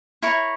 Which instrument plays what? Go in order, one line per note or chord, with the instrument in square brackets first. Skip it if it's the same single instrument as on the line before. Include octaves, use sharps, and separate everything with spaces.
[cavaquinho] E4 A#4 C#5 C#6